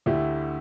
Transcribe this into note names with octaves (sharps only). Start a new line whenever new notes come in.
D2 D3 A3 E4 G4